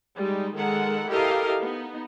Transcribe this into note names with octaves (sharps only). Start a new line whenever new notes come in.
G3 G#3 D#4
D#3 G#3 A4 A#4 F#5
E4 G4 A4 A#4 D#5 F5
B3 D#4